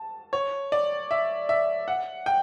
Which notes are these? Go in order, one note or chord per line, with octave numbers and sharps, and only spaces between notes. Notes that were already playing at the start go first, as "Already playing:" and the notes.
Already playing: A5
C#5
D5
E5
E5
F#5
G5